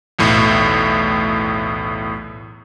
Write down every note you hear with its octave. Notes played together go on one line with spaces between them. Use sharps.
B1 E2 A2